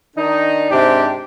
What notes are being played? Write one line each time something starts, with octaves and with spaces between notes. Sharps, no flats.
D#3 D4 D#4
G#2 C3 D4 G4